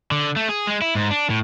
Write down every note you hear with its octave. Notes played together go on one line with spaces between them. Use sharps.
D3
A3
G#4
G#3
E4
G#2
D4
A2